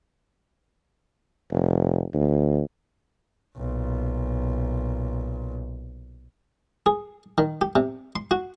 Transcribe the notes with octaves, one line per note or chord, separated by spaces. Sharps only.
F1
D2
B1 A#2
G#4
D#3
G4
C3
C6
F#4